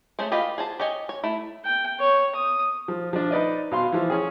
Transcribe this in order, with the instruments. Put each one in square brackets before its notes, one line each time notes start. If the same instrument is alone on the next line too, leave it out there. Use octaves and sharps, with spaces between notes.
[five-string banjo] A3 C#4 G#4 C5
F4 G4 B4 D#5 F5
G#4 C5 A5
G4 C#5 D#5 G#5
C#5
A3 E4
[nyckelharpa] G5
C#5
D#6
[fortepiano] F3
F3 D4
D#4 B4 D5 D#5
B2 F5 C6
E3 F3
C#4 G#4